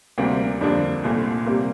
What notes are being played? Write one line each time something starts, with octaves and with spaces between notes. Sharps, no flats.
D2 C3 G3 A#3
F2 D3 G3 A#3 D4
C2 A#2 A3
C3 G3 A#3